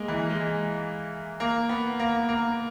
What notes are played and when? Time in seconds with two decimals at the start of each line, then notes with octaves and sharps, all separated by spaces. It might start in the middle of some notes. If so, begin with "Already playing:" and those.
Already playing: G#3 A#3
0.08 E3
0.30 G#3
1.40 A#3
1.69 B3
2.00 A#3
2.29 A#3